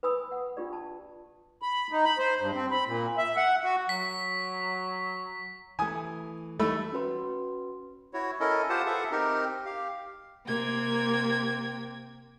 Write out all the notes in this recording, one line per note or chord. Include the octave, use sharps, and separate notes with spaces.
B4 G5 G#5 B5 D#6 E6
F#5
D4 F4 G4 D5
A5
B5
D#4
B5
C5
G2
C4
B5
A#2
E5
F#5
F#4
F#3 B6
E3 A3 G#5 D#6
E3 G3 A3 D#4 B5 E6
C#4 F#4 B4 C6
E4 F#4 C#5
C#4 E4 A4 A#4 D#5
F4 G4 C5 F#5 A5
G#4 A4 B4 E5 F#5
C4 D#4 G4 A#4
G4 F5
C3 A#3 G5 G#6